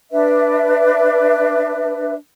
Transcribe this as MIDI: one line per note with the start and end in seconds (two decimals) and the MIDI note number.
0.12 2.15 62
0.12 2.15 71
0.12 2.15 76